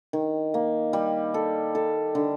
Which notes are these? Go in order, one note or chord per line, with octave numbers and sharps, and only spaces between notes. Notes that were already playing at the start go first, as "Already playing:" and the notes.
D#3
A#3
G3
A4
A4
D3